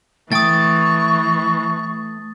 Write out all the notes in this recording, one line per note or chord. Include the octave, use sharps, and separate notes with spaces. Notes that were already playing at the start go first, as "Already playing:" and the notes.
E3 A3 G5 C#6 D#6 A6